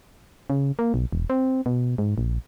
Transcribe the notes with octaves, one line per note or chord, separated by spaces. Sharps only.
C#3
A#3
B1
E1
C4
B2
G#2
A#1